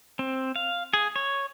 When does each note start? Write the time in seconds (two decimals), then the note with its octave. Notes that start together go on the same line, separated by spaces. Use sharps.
0.19 C4
0.56 F5
0.94 G#4
1.16 C#5